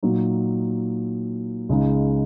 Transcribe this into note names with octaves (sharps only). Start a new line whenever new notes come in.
A#2 F#3 D#4
C#2 C#3 G#3 D#4